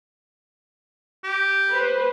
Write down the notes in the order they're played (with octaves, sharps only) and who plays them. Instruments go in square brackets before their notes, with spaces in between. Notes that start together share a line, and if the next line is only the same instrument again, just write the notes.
[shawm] G4
[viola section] B4 C5